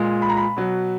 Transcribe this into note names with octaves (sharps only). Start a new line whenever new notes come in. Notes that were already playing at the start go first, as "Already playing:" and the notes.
Already playing: A#2 G#3
B5
A#5
B5
B2 F#3